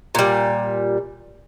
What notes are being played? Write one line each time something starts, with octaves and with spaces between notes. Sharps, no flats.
A#2 G3